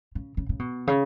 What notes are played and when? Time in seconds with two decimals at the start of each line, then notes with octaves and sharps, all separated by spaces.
0.15 C#3
0.37 C#3
0.49 C#3
0.59 B2
0.87 C#3